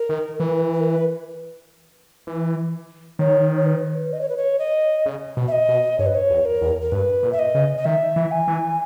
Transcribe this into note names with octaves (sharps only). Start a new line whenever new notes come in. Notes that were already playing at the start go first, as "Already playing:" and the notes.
Already playing: A#4
D#3
E3 B4
B4
A#4
B4
E3
D#3 C#5
C#5
B4
D#5
C#5
B4
C#5
D#5
C#3
B2
E5
D#5
B2
G2 C#5
B4
C#5
E2
A#4
E2
A#4
G2 B4
A#2
E5
D#5
C#3
D#5
D#3 E5
E3
G#5
E3